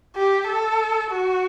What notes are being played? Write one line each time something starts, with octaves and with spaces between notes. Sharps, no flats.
G4
A4
F#4